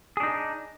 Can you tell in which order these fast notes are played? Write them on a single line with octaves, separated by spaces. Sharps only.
G#4 D4 D#4